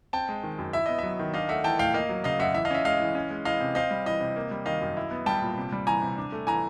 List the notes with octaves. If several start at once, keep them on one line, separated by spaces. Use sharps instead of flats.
C4 G5 A5
G#3
D#3
F#2
E4 E5
B3 D#5
F#3 E5
D#3
D4 D#5 F5
A3 E5 F#5
E3 G5 A5
A2 F5 G5
A#3 D#5 F5
F#3
C#3 D#5 F5
F#2 E5 F#5
E3 E5
D#5 F5
C#4 E5
G#3 D#5 F5
E3
C#4
G#3
E3 D#5 F5
C3
C4 D#5 F5
G3
E3 D#5
C3
A#3
G3
D#3 D#5 F5
F#2
E4
B3
G3 G5 A5
A#2
C3
G3
E3 G#5 A#5
C3
D4
A3
E3 G#5 A#5